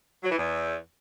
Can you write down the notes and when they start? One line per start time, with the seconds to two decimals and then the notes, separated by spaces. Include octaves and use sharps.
0.24 F#3
0.31 E3
0.38 E2